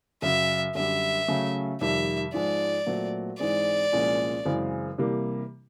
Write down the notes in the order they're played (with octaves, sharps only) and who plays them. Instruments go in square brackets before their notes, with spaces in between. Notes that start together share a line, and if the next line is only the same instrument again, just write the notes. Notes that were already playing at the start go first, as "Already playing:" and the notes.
[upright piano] F#2 C#3 F#3 [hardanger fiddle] E5
[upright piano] F#2 D3 G3 [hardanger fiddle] E5
[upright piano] C#3 F#3 A3 C#4
[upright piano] F2 C3 D#3 G3 [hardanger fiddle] E5
[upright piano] G#2 F3 G#3 [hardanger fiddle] D5
[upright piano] A#2 F#3 A3 C4
[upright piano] G#2 E3 G#3 C4 [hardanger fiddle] D5
[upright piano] C2 A#2 F3 G#3 C#4
F#2 C#3 E3 G#3 C4
C3 E3 G3 A#3